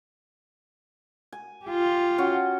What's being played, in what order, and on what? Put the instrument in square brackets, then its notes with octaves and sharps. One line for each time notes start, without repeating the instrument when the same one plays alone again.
[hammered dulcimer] G#5
[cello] F4 G4
[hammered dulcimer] C#4 F#4 F#5